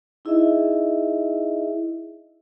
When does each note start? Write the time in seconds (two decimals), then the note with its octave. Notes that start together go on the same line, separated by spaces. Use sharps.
0.25 D#4 E4 G#4 D#5 E5